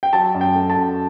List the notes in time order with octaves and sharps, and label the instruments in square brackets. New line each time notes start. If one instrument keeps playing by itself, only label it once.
[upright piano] G5
F#3 A5
F#2
G5
A3
A5
F#2